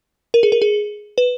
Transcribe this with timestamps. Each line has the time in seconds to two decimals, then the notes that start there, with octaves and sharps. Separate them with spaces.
0.34 A#4
0.43 G#4
0.52 A#4
0.62 G#4
1.18 B4